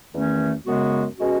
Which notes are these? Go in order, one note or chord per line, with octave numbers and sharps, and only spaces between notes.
E2 D#3 A3 C#4
F#2 C#3 G#3 B3 F#4
B2 G#3 C#4 F#4